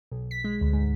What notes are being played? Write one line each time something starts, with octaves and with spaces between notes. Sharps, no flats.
B1
B6
G#3
D2
G#2